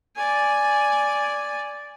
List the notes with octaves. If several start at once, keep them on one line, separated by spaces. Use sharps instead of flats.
D5 G#5